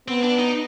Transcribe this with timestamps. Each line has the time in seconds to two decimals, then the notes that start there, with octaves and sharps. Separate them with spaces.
0.08 B3 C4
0.23 D4
0.39 D#4